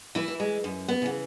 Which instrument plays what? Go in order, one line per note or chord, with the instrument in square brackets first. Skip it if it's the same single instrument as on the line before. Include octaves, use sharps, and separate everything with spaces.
[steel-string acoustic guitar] E3 E4
E3
G#3
F#2
B3
C#3 E3